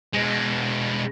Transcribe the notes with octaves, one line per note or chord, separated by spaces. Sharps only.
B2 G#3